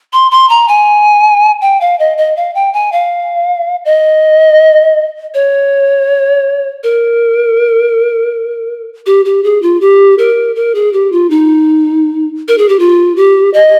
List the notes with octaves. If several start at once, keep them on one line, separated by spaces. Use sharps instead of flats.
C6
C6
A#5
G#5
G5
F5
D#5
D#5
F5
G5
G#5
F5
D#5
C#5
A#4
G4
G4
G#4
F4
G4
A#4
A#4
G#4
G4
F4
D#4
A#4
G#4
G4
F4
G4
D#5